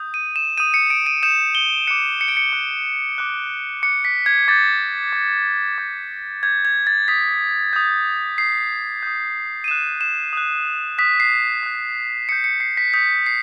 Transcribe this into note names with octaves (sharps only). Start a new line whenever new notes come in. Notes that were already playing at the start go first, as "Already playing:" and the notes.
Already playing: D#6 G6
D#7
E7
D#6 G6 D#7
C#7
D7
D#7
D#6 G6 E7
G7
D6 F#6 C#7
C#7
D7
C#7
D6 F#6
D6 F#6
D6 F#6 C#7
B6
G#6
D6 G6 A6
D6 G6
D6 G6
D6 G6 G#6
G#6
A6
D#6 G6 B6
D#6 G6
D#6 G6 C7
D#6 G6
D#7
D#6 F#6 E7
E7
D#6 F#6
D#6 F#6 B6
C7
D#6 F#6
D#6 G6 C#7
C#7
C7
B6
D#6 G6 B6
C7